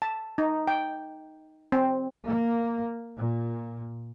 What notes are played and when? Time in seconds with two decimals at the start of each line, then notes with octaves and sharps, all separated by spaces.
0.02 A5
0.38 D#4
0.67 G5
1.72 C4
2.26 A#3
3.16 A#2